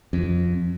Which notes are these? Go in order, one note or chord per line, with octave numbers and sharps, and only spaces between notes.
F2